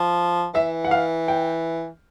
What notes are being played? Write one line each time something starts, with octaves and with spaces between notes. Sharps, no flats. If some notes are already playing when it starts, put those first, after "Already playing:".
Already playing: F3
E3 E5
F#5
F5
G5